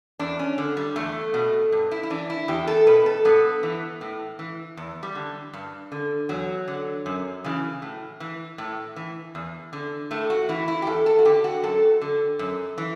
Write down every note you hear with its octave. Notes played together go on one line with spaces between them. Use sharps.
E2 D4
C#4
D3
G3
E2 A3
B2
G2
E4
E4
E3 D4
E4
E2 G4
A4
B2 B4
A4
G2 B3
E3
A2
E3
E2
G3
D3
G2
D3
E2 F#3
D3
F#2
C#3 E3
A2
E3
A2
E3
E2
D3
A2 A3
F#4
E3 E4
E4
G4
E2 A4
A4
F#4
D3 G4
F#4
F#2 A4
D3
F#2
E3